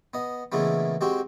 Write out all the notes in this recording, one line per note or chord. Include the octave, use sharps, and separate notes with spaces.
B3 D#5
A#2 C#3 E3 G#3 A3 B3
G#3 C4 F#4 G4